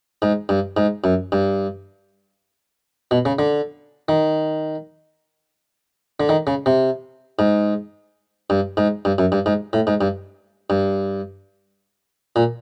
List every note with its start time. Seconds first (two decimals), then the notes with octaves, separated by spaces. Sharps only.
0.22 G#2
0.49 G2
0.77 G#2
1.04 F#2
1.32 G2
3.11 B2
3.25 C#3
3.39 D3
4.09 D#3
6.20 D3
6.29 D#3
6.47 C#3
6.66 C3
7.39 G#2
8.50 G2
8.77 G#2
9.05 G2
9.18 F#2
9.32 G2
9.46 G#2
9.73 A2
9.87 G#2
10.01 G2
10.70 G2
12.36 A#2